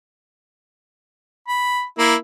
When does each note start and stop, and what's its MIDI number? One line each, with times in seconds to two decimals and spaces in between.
1.48 1.83 83
1.98 2.15 58
1.98 2.15 64